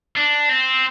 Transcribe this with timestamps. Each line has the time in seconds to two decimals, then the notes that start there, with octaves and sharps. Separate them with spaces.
0.16 D4
0.49 C4